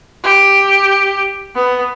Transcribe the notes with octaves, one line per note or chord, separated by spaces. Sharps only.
G4
B3